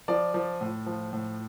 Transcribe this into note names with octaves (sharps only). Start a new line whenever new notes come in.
F3 D5
F3
A2
F3
A2